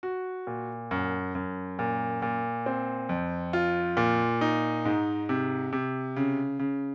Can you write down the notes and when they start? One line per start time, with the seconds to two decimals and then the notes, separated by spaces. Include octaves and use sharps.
0.03 F#4
0.47 A#2
0.91 F#2
1.35 F#2
1.79 A#2
2.22 A#2
2.66 C4
3.09 F2
3.53 F4
3.97 A#2
4.41 D#4
4.85 G#2
5.29 C3
5.73 C3
6.16 C#3
6.59 C#3